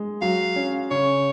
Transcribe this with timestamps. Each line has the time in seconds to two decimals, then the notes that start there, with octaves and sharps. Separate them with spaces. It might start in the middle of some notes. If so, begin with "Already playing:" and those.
Already playing: G#3
0.21 F#3 F5
0.56 C#4
0.91 C#3 C#5